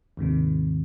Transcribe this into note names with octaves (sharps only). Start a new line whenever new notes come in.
D#2 G#2 C3 D#3